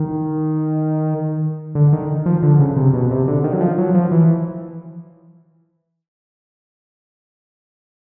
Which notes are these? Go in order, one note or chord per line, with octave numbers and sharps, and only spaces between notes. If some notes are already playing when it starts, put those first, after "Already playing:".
Already playing: D#3
D3
D#3
F3
D3
C#3
C3
B2
C3
D3
D#3
F#3
F3
F#3
F3
E3